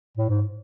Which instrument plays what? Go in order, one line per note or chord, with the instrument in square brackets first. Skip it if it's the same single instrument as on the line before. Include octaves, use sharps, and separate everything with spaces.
[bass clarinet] A2
G#2